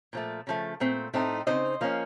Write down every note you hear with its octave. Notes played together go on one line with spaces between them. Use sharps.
A#2 F3 A3
C#3 F3 A3
A#2 A3 C4
A2 A3 C4 D#4
C#3 F#3 C4 D#4 C5 D#5
F3 A#3 C#4